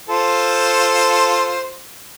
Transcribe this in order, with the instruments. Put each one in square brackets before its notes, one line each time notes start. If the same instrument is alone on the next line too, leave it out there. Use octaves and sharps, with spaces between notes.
[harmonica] F4 A4 C5